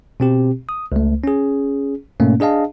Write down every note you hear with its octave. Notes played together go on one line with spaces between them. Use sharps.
B2 C4 G4
D#6
C#2 A3
C#4 G#4
G#2 B2 A3 A#3 C#4
D4 G#4 D#5 F5 A5